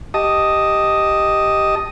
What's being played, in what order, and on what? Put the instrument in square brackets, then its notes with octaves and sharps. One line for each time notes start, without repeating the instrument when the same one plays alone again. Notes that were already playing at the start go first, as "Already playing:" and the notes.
[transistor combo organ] G4 D#5 A5 D#6